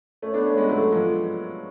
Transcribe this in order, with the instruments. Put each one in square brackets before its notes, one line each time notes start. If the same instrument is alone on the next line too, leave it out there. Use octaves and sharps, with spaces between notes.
[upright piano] A3 C#4
B3 D4
A3 C#4
G#3 B3
F#3 A3
F3 G#3